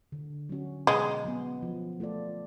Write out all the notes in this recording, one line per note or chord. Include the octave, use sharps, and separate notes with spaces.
D3
F#3 C#4 F#4
B2 G#3
F#3 B3
F3
A3 F4 A4 D5